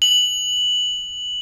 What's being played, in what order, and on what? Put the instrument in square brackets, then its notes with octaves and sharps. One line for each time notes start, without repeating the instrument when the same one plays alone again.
[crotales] F#7